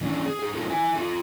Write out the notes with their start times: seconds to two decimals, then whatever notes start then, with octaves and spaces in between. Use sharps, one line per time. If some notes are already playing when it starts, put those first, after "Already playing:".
0.01 E3 C#4 D4 E4
0.26 G#4
0.39 G#4 C5
0.54 D#4 F4 A4 A#4 C5
0.70 E4 E5 G#5
0.96 F4 A4